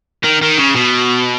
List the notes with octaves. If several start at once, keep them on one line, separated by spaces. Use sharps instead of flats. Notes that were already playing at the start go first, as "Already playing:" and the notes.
D#3
D#3
C#3
B2